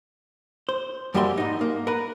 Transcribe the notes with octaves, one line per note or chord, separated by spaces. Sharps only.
C5
F#2 G3 A#3 G4 E5 C6
G#2 D#4
A#3
A#4 B4